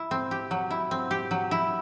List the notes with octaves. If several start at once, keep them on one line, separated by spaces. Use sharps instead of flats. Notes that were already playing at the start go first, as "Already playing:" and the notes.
Already playing: E4
C4
G4
F#3
E4
C4
G4
F#3
E4